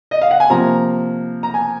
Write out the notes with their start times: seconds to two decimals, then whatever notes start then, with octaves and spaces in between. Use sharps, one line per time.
0.11 D#5
0.21 F5
0.31 F#5
0.40 G#5
0.50 C3 F3 A#3 A#5
1.43 A#5
1.54 G#5